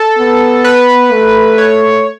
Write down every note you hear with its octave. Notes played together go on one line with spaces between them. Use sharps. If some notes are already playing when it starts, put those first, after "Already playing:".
Already playing: A4
B3
B4
A3
C#5